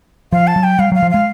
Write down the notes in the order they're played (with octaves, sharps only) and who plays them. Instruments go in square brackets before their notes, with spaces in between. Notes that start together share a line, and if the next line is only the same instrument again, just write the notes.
[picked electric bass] F3 [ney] F5
[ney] A5
[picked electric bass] F#3
[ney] G5
[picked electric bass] G3 [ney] F5
[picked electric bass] F#3 [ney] F5
[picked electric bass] F3
[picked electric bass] G#3 [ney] F5